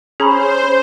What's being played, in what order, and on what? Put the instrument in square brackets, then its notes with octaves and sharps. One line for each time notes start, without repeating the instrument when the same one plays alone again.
[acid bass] C#4 [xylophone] G#4 A#5 B5 [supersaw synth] C5